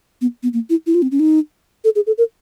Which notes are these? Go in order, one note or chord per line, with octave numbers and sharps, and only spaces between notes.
B3
B3
A#3
E4
E4
F4
C4
C#4
D#4
A4
G#4
A4
A#4